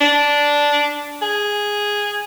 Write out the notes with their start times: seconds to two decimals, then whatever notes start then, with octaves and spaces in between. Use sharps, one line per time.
0.01 D4
1.22 G#4